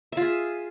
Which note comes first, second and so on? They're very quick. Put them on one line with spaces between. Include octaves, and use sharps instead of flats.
E5 F4 G#4